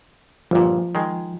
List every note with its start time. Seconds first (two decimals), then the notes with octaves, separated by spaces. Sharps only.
0.51 G1 A#2 F3
0.95 D#3 G#3